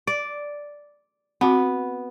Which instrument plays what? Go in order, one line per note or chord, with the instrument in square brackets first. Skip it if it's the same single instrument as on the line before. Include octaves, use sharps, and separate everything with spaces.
[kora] D5
[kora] B3 [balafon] C4 F#4